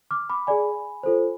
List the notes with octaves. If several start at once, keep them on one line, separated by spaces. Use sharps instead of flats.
D6 F6
B5 D6
G#4 D5 G#5 B5
F4 A4 C5